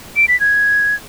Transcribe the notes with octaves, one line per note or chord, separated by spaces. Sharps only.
D7
B6
G#6